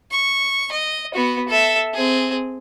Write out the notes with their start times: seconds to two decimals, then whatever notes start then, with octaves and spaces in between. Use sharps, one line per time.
0.11 C#6
0.72 D#5
1.14 B3 F#4
1.48 A4 E5
1.94 C4 G#4